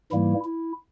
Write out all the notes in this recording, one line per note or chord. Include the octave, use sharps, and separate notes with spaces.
G#2 E3 G3 A#3 E4
E4